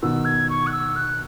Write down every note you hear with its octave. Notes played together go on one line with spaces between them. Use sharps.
B2 D#3 E6
G#6
C#6
F#6
E6
F#6